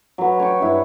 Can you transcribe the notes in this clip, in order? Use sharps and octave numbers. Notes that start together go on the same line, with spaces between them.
F#3 B4
C#5 G5 C#6
G2 E4